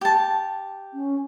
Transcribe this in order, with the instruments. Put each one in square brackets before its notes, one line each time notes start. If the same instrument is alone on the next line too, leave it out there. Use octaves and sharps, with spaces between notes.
[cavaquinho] G4 A5
[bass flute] C#4